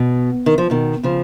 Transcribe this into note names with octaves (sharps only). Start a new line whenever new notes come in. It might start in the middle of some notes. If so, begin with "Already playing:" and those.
Already playing: B2
D#3
F3
B2 D#3
C#3 F3